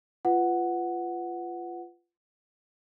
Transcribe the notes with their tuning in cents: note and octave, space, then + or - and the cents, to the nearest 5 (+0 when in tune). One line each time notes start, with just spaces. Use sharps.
F4 -15 B4 +10 F#5 +0